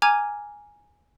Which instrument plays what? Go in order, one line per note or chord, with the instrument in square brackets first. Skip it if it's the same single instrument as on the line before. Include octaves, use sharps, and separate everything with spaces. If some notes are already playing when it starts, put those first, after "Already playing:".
[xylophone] G#5 A#5 D6 F6 G#6 D#7